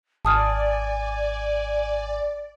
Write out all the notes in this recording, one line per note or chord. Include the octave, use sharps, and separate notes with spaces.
G#1 D5 G#5 A5 D#6 F6